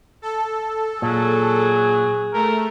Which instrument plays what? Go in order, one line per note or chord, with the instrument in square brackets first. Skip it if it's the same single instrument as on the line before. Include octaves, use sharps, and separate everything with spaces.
[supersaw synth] A4
[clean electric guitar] A#2 [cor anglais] F#3 [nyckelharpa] G#4
[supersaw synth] A3 [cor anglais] A#4